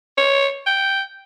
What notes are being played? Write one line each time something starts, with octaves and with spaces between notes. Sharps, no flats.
C#5
G5